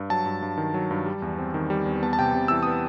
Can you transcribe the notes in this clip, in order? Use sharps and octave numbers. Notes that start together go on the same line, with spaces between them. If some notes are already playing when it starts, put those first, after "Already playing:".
Already playing: G2
F#3 A5
G2
G2
D#3
F#3
G2
G3
E2
C4
D#3
G3
E2
B3 A5
A5
C3 G5
C3
E3 E6
B3 D#6